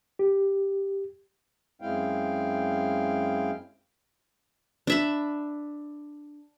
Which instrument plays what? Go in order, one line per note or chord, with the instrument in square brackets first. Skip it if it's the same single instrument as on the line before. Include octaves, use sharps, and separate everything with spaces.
[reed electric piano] G4
[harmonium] F#2 G#3 C4 E4 F5 G5
[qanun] D4 E5 B5